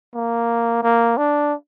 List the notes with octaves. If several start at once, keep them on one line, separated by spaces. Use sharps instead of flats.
A#3
A#3
D4